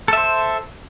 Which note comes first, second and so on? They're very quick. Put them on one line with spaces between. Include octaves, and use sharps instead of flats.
A4 E5 C5